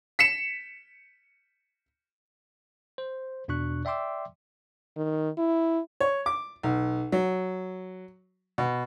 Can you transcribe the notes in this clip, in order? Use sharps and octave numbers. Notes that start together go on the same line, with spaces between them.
B6 C#7 E7
C5
E2 B2 D4 C#6 F#6
D5 E5 G5 C6 D6 E6
D#3
E4
C#5
D6
B1
F#3
B2